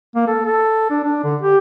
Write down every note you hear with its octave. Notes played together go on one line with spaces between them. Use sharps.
A#3
A4
A4
D4
D4
D3
G4